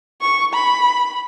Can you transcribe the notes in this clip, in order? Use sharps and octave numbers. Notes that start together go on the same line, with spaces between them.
C#6
B5